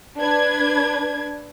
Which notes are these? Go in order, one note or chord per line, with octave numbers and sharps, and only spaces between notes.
D4 B4 G#6